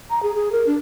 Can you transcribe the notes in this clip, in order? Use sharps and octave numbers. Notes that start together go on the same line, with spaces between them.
A#5
G#4
G#4
A#4
D4